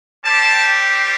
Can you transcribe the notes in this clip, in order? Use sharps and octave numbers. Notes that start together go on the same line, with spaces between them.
G3 C4 G4 A5